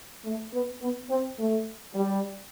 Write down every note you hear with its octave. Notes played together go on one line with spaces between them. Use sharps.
A3
B3
B3
C4
A3
G3